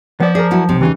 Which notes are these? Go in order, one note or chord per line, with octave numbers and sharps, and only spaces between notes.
F3 B3 D5
G#4 A#4 D5
F#3 E4 F#4
B1 C3
D#2 C#3 E3 G3